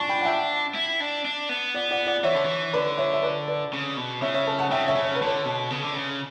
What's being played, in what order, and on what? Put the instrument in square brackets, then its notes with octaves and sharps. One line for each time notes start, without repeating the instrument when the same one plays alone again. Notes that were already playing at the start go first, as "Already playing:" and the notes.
Already playing: [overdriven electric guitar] D4 [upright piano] A5 C#6
[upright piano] G5 B5
F#5
E5 G5
[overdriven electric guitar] E4
D4
D4
B3
[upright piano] D5 F#5
D5 F#5
D5 F#5
[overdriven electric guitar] E3 [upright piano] C#5 E5
[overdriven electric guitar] D3
E3
[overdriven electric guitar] D3 [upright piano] B4 D5
[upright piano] C#5 E5
E5
B4 D5
B4 D5
[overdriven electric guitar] C#3
B2
[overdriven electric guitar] C#3 [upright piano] C#5 E5
[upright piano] C#5 E5
A4 C#5
F#5 A5
[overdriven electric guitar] C#3 [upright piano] E5 G5
[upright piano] C#5 E5
[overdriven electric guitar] C#3
[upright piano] C#5
B4
[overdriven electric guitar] D3 [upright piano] A4 C#5
[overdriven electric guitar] B2
C#3
D3
C#3